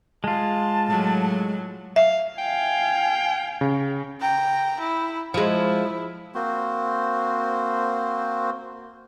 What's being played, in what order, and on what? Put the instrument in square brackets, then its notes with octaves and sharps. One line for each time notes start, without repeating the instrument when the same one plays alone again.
[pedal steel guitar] G#3 F4 [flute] A5
[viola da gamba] A2 F#3
[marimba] E5 [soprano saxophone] F5
[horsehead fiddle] F5 G#5 [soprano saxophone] G5
[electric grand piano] C#3
[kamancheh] G5 A#5
E4
[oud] F3 G#3 [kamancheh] E4
[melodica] A#3 C4 F#4 C5